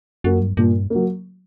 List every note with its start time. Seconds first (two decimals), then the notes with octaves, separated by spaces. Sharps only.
0.24 F#2 F#3 A#3
0.41 G2
0.57 G2 A#2
0.90 F#3 A#3